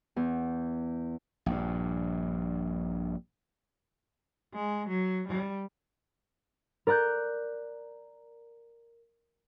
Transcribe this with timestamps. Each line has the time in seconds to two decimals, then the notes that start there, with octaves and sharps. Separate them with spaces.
0.16 E2
1.46 A#1 G2
4.55 G#3
4.89 F#3
5.28 G3
6.87 A#4 D5 A#5 F#6 G6